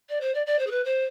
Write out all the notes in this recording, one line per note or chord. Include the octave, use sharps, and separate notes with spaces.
D5
C5
D5
D5
C5
G#4
B4
C5